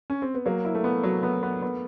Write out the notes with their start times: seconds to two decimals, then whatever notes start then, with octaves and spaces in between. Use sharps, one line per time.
0.10 C#4
0.22 C4
0.34 B3
0.46 F#3 A#3
0.65 E4
0.75 A3
0.84 B3
1.03 F#3
1.23 B3
1.43 B3
1.62 B3